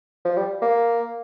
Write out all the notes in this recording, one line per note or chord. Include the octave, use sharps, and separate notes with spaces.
F3
G3
A#3